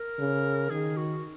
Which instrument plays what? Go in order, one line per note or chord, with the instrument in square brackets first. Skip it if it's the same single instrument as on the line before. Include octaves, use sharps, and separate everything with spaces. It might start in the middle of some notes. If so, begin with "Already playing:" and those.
Already playing: [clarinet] A#4
[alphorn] C#3
[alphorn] D#3 [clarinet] G#4
[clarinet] F#4